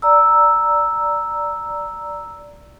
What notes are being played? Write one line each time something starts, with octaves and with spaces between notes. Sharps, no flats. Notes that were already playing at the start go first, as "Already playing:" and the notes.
D5 A#5 E6